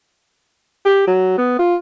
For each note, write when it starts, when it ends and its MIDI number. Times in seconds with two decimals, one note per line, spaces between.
0.85 1.05 67
1.07 1.35 54
1.38 1.55 59
1.59 1.75 65